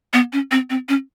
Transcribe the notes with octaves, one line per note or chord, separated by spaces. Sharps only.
B3
C#4
C4
C4
C#4